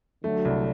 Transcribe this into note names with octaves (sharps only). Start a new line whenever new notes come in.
D3 F#3 A3
C2